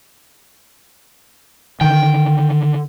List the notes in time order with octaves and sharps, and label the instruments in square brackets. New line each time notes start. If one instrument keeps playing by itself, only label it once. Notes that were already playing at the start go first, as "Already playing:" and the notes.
[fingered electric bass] D3 D#3 [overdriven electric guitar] G5